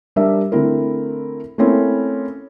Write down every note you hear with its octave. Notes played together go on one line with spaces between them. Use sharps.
G3 D4 A#4 E5
D3 A3 C4 E4 A#4
A3 A#3 C4 C#4 E4